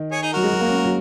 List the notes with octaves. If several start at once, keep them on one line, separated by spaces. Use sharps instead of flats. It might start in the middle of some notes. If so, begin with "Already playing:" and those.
Already playing: D#3
G#4 C#5
D#4 G#4
F#3 F#4 A#4
G#3
F#3
A#3
C#4
A#3
F#3